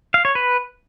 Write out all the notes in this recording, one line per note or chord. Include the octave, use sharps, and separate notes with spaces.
F5
C#5
B4